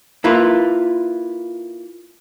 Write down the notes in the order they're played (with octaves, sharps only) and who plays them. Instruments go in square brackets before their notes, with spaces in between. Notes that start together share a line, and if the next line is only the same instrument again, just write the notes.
[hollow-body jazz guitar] A#3 E4 F4 B4